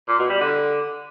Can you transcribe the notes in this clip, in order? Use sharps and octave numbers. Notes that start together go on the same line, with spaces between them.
A#2
B2
G3
D3